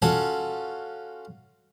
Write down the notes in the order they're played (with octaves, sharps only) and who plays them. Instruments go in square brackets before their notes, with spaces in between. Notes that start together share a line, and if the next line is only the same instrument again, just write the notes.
[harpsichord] C#4 F4 F#4 A4 F#5 G#5